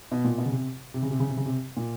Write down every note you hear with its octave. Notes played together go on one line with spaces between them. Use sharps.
B2
A#2
B2
C#3
C3
C3
C#3
C3
C#3
C3
C#3
C3
A#2